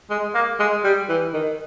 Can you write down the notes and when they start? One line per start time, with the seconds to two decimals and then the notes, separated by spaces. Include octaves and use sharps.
0.10 G#3
0.34 A#3
0.60 G#3
0.84 G3
1.09 E3
1.34 D#3